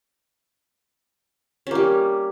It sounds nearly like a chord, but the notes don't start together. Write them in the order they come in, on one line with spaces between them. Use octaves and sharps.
C#4 A#3 G3